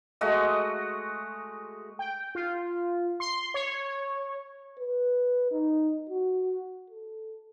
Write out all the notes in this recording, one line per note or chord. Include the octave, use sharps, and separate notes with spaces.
G#3 A3 F#4 D#5
G5
F4
C6
C#5
B4
D#4
F#4
A4